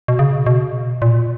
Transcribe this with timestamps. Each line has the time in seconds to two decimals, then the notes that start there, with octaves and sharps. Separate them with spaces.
0.08 B2
0.19 C#3
0.46 B2
1.02 A#2